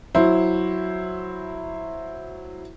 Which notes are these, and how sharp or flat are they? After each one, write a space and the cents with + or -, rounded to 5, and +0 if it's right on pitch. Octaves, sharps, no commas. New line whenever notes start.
F#3 -5 E4 +0 C5 +0